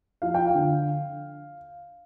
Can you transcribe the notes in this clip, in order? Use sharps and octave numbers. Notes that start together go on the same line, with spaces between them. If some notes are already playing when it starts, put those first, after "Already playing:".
F3 F5
G5
F5
D3